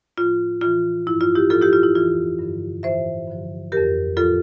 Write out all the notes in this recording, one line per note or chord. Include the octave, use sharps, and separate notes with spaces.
A2 F3 F4
A2 E3 F4
G2 F3 E4
F4
E4 G4
A2 F3 F4 A4
E4 G4
F4
E4
F2 E3 F4
G2 D3 F3
A2 E3 C5 E5
G2 D3 F3
F2 E3 G4 A#4
A2 F3 F4 A4